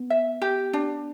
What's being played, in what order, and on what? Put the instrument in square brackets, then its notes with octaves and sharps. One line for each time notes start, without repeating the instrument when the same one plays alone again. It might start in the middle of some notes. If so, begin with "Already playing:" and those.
Already playing: [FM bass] B3
[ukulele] E5
G4
D4